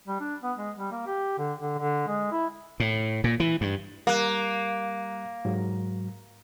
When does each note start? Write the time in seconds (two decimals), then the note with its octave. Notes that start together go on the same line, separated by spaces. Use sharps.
0.08 G3
0.21 D4
0.43 B3
0.58 G#3
0.79 G3
0.92 A#3
1.07 G4
1.38 D3
1.59 D3
1.78 D3
2.07 G#3
2.32 E4
2.80 A2
3.24 A#2
3.40 E3
3.61 G2
4.07 G3 A#3 F#6
5.45 G#2 F#3